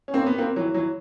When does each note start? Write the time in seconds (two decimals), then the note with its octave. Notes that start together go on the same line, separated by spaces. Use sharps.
0.08 C#4
0.14 A#3 C4
0.26 B3
0.38 A#3 C4
0.56 E3 F#3
0.74 E3 F#3